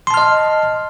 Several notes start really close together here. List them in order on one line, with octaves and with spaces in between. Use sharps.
C6 A5 F6 D#5